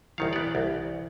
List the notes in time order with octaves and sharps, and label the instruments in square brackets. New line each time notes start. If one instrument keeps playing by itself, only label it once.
[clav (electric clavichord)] C2 D#3 F5 [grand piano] E3 C#7
[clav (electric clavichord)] B3 D5
C2